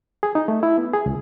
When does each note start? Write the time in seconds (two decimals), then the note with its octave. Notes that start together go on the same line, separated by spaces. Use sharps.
0.23 G#4
0.35 D#4
0.48 A3
0.63 E4
0.78 B3
0.93 G#4
1.06 C#2